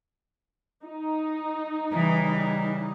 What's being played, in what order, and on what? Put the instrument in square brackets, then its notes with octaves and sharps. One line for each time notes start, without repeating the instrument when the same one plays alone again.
[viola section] D#4
[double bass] C#3 G3 [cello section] E3